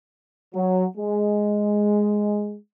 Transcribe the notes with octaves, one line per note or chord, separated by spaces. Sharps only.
F#3
G#3